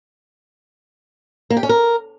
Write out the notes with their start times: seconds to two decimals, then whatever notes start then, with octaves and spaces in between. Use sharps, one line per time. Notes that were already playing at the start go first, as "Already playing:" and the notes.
1.50 A#3
1.57 G4
1.63 C#4
1.69 A#4